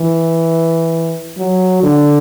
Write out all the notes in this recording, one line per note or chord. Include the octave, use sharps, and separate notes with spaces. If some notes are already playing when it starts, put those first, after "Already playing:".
Already playing: E3
F#3
D3